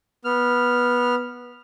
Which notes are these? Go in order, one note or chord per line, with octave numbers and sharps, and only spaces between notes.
B3 F6